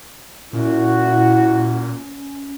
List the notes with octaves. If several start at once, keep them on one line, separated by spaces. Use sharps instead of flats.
A#2 C#4 E4 F#4